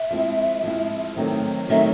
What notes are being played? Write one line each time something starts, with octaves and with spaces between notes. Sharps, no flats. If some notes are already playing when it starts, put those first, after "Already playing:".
Already playing: E5
F3 G#3 C4 E4
F3 G#3 C4 E4
D#3 F#3 A3 C4 D#4
D#3 F#3 A3 C4 D#4 E5